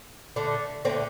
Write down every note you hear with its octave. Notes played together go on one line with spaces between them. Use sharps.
D3 A3
D3 A3 C4